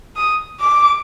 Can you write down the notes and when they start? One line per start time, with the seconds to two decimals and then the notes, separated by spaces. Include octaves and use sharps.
0.16 D#6
0.60 D6